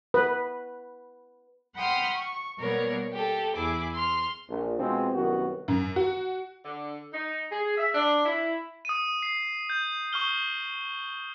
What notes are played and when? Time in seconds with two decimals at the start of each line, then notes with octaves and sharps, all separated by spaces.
0.14 B4
1.76 F#5 G5 B5 C6 D#6 F6
2.14 C#6
2.58 B2 G3 A#3 B3 A#4 C#5
3.14 G4 A4
3.55 E2 E4 G#4 D6
3.95 C6 F6
4.48 A#1
4.79 B2 F3 G#3 C4
5.14 C2 F#2 D#3 B3 F#4
5.68 F#2
5.96 F#4
6.63 D3
7.12 D#4
7.51 G#4
7.77 E5
7.93 D4
8.25 E4
8.85 D#6 D#7
9.23 C7
9.70 G6
10.13 C#6 D#6 F6 G7